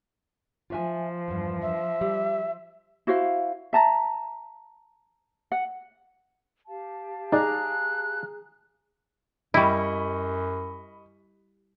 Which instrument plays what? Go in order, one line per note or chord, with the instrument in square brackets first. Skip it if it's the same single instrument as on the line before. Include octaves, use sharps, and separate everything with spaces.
[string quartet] F3 [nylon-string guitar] F4 E5 G#5
[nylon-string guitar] E2 G2
[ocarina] E5
[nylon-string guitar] G3
[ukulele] E4 F#4 C5 F5
E5 A5 A#5
F#5
[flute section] G4 F5 A5
[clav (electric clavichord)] D#4 D5 [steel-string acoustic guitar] G#4 A#5 [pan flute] F#6
[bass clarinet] F#2 [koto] G3 E4 [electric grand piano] D#5 C#6 [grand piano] B5